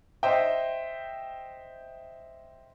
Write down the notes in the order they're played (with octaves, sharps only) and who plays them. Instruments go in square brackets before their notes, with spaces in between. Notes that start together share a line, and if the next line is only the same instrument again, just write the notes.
[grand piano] C5 D#5 E5 G5